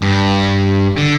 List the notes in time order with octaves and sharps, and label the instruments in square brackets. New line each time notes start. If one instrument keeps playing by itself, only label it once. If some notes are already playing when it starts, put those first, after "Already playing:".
[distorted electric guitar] G2
D3